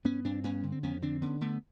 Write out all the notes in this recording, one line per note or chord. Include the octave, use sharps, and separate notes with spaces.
G2 B3 C#4
G2 C4 D4
G2 B3 C#4
D3
C4
F2 B3 C#4
D3 C4 D4
D3 B3 C#4
D3 A3 B3